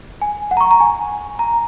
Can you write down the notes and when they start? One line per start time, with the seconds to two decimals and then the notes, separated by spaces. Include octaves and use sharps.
0.22 G#5
0.51 F#5
0.57 A#5
0.61 C#6
0.71 A#5
0.80 G#5
1.39 A#5